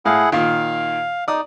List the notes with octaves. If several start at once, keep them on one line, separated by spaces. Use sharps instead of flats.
A2 E4 G#4 F5 F#5
A#2 D#3 F5
D#4 D5 D#6